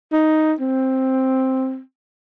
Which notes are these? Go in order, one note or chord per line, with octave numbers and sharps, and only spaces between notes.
D#4
C4